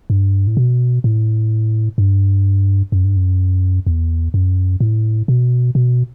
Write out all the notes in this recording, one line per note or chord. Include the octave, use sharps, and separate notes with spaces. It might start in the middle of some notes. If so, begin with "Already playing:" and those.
G2
A2
B2
A2
G2
F#2
G2
F#2
E2
F#2
A2
B2
B2